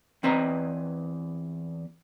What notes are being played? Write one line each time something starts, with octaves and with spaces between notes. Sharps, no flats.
E2 C4 B4 D#5 A#5